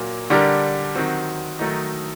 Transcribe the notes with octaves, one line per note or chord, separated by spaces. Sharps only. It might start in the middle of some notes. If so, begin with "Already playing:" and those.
Already playing: A#2 F#3 A#3
D3 G3 D4 G4 A#4
D#3 F#3 C4 F#4
D#3 F#3 A3 D#4